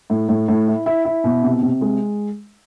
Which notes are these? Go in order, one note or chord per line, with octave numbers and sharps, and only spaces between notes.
A2
A2
A2
E4
E4
E4
B2
C3
C3
G#3